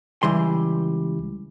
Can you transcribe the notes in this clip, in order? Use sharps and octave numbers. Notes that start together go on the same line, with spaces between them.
C#2 E3 G3 C6